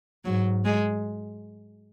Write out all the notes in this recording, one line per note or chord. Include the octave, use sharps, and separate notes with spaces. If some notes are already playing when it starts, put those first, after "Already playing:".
G#2 F#3
G#3